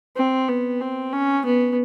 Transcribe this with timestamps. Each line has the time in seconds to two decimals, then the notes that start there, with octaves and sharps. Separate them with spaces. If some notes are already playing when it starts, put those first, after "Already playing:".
0.16 C4
0.49 B3
0.81 C4
1.13 C#4
1.45 B3